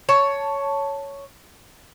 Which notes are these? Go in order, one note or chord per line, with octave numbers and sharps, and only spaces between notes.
C#5 A5